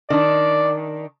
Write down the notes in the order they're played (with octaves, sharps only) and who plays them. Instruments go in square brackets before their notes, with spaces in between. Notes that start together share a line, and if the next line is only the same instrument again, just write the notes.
[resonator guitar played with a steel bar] D#3 D4 [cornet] D5